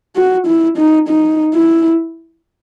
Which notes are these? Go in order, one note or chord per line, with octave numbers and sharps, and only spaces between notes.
F#4
E4
D#4
D#4
E4